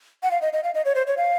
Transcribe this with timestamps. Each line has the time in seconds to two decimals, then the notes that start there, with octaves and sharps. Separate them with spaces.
0.23 F#5
0.31 F5
0.42 D#5
0.53 D#5
0.64 F5
0.74 D#5
0.85 C#5
0.95 C5
1.07 C#5
1.17 F5